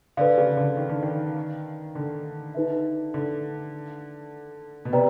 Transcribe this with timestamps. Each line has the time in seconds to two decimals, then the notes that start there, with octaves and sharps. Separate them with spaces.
0.17 D3 B4 D5 F5
0.38 C#3
0.57 D3
0.77 D#3
0.89 D3
1.03 D#3
1.95 D3
2.55 D#4 G#4 B4 E5
3.14 D3
4.85 B2
4.93 C3 B4 D5 G5 A#5